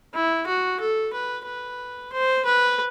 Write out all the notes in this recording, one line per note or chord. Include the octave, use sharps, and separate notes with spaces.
E4
F#4
A4
B4
B4
C5
B4